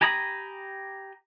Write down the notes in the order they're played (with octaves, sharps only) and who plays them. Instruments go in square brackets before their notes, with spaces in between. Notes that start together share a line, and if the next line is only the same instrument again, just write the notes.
[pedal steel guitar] G4 G#5 A#5 B5 D#6